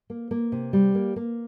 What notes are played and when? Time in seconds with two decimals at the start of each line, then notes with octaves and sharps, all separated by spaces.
0.10 A#3
0.31 A#3
0.52 C3
0.73 G3
0.95 A#3
1.16 A#3